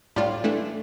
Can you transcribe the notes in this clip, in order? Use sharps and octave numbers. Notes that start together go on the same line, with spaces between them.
A2 G3 D4 F4
E3 A3 D4